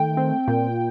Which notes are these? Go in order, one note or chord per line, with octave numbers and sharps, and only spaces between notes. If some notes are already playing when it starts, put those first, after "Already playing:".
Already playing: D#3 A3 G5
C4
A#2